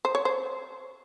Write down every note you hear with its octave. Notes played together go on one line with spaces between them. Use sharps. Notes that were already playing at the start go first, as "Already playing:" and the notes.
C5
C#5
C5